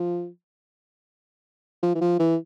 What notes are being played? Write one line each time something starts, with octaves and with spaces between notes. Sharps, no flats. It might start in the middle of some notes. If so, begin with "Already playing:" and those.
Already playing: F3
F3
E3
F3
E3